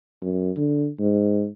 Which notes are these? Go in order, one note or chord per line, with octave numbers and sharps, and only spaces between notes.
F#2
D3
G#2